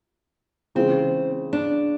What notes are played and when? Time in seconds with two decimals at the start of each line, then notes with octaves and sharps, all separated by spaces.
0.75 C#3 E3 G#3 C4 C#4
1.53 D4